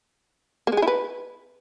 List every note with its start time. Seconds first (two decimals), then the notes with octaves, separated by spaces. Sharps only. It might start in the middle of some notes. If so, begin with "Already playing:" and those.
0.67 A#3
0.72 G#3
0.77 G#4
0.82 E4
0.88 B4